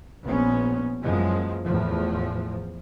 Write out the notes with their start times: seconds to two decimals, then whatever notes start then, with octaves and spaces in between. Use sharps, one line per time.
0.23 A#1 B3 C#4
1.03 F#2 E3 F3 G#3 A#3
1.64 E2 A2 F3